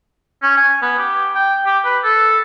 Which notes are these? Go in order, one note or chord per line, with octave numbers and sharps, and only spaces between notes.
C#4
G#5
B3
G4
G5
G4
B4
A4